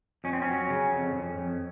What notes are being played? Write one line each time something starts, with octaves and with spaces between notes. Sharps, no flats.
F2 C#4
C4
C#4
F#3
C#3
F2
F2
F2